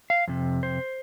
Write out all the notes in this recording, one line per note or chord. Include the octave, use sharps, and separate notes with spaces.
F5
F2 C3
C5